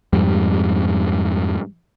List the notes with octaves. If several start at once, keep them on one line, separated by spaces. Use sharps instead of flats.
F2 G#2 G3